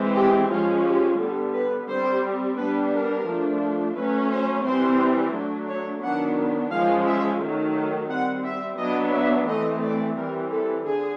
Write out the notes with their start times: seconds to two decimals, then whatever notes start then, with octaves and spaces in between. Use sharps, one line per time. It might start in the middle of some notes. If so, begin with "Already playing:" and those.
Already playing: E3 G#3 C4
0.16 G4
0.50 F3 G#3 C#4 F4
0.85 G4
1.19 D3 G3 B3 A4
1.54 B4
1.88 G3 C4 C5
2.57 G3 B3 D4 B4
2.92 A#4
3.26 F3 A3 D4
3.95 F#3 A3 C#4 B4
4.30 C5
4.64 E3 G3 C4 C5
5.33 F#3 A3 D4
5.68 C#5
6.02 D#3 F#3 B3 D4 F#5
6.71 F3 G#3 C#4 F5
7.06 E5
7.40 D#3 F#3 A3
8.10 G3 C4 F#5
8.44 E5
8.78 F#3 B3 D4 D#5
9.13 E5
9.47 E3 A3 C4 D#5
9.82 D5
10.16 E3 G3 C4 A#4
10.50 A4
10.85 D3 G#4